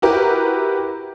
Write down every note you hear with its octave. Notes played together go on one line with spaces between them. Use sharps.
E4 F#4 G4 A#4 B4